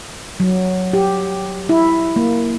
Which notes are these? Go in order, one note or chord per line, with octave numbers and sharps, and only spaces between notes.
F#3
G4
E4
A#3